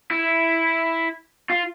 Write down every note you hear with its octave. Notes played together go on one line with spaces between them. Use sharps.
E4
F4